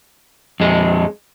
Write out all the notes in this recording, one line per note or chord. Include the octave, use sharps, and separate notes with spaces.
F2 G#3